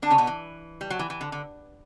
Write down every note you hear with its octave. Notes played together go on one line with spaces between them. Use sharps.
D3 D4
C#3 C#4
B2 B3
E3
G3
F#3
E3
E3
D3
D3